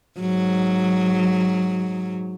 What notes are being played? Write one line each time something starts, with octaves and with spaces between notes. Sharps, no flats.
G#2 F#3